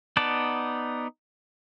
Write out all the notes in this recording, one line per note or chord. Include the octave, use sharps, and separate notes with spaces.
B3 D#4 D5 F#5 A5